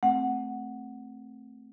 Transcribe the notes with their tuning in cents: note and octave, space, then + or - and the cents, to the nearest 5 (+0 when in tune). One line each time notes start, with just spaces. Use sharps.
A3 +0 C4 +0 F#5 +0